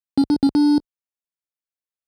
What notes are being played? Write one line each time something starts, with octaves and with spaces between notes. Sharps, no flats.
C#4
D4
C#4
D4